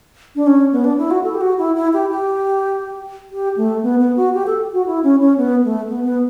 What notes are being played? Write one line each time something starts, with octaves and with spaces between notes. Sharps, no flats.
D4
C#4
B3
D4
E4
F#4
A4
G4
F#4
E4
E4
G4
G4
G4
A3
B3
B3
F#4
G4
A4
F#4
E4
C#4
C#4
B3
A3
B3
B3